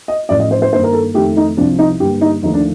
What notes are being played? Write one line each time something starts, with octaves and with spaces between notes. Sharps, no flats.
D#5
A1 A2 F3 D5
D#5
C5
C5
G2 D#3 A#3 C5
A#4
A4
F2 D#3 A3 G4
D#4
C2 C3 F3 D4
D#4
G2 D3 G3 A#3 G4
D#4
D#2 D3 F3 A3 D#4
D4